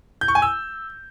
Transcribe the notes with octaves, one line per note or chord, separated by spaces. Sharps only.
G6
C#6
G#5
E6